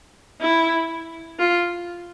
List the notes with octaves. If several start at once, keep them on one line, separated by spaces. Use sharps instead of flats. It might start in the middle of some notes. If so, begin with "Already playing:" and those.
E4
F4